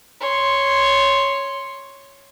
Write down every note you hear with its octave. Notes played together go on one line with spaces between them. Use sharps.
C#5 C6